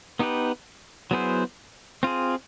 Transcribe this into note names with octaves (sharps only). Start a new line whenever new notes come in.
B3 D#4 G4 B4
F#3 B3 E4 G#4 C5
C4 F4 G#4